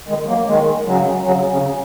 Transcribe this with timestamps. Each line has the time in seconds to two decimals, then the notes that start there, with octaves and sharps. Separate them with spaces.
0.08 D#3 G#3
0.28 F#3 A#3
0.47 D#3 G#3
0.85 C#3 F#3
1.24 C#3 F#3
1.50 C#3